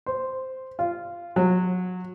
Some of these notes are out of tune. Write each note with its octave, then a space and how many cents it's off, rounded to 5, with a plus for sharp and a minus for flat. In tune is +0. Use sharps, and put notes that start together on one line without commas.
C5 -5
F4 -15
F#3 -25